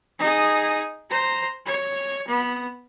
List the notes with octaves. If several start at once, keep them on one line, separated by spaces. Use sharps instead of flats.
D#4 G#4
C5 A#5
C#5
B3